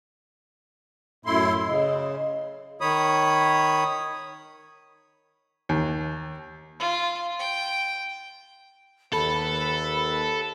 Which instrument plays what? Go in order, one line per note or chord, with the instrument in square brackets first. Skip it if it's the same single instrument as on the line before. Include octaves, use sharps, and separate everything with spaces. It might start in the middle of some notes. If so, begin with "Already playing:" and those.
[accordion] F#2 E4 C6 [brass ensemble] A2
[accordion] C#3 [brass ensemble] D#5
[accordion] D#3 C#5 B5 D#6
[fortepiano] D#2
[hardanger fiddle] F4
G5
[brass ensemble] D#2 B4 [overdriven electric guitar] A4 [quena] B5